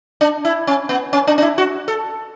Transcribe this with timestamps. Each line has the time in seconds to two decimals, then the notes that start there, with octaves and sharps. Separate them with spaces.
0.21 D4
0.45 E4
0.67 C#4
0.89 B3
1.13 C#4
1.27 D4
1.38 D4
1.42 E4
1.58 F#4
1.88 A4